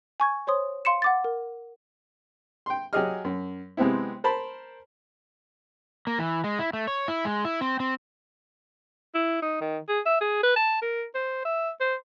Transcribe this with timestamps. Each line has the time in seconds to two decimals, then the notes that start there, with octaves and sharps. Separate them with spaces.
0.20 G#5 C#6 G#6
0.47 C5 C#5 C6 D#6
0.85 F5 C6 C#7 E7
1.02 F#5 D6 A6
1.24 A#4
2.66 G5 C6
2.93 F#3 G4 G#4 D#5 F6
3.24 F#2
3.77 C3 G#3 B3 C4 E4
4.24 A#4 C5 A5 B5
6.07 A#3
6.19 E3
6.44 G#3
6.59 E4
6.73 A3
6.87 C#5
7.08 E4
7.25 G#3
7.45 E4
7.61 C4
7.80 C4
9.15 E4
9.43 D#4
9.61 D#3
9.89 G#4
10.06 E5
10.21 G#4
10.44 B4
10.56 A5
10.82 A#4
11.15 C5
11.45 E5
11.81 C5